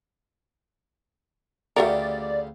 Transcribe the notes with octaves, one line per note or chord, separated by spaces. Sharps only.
D2 C#3 A3 F#4 G4 A#4 D5